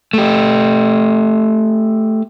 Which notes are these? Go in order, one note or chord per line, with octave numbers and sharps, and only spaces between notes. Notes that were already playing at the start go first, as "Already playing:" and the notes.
A3 G4